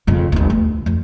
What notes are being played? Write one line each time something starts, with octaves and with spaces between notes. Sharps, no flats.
F2 C#3
G1 D#2
D2
F2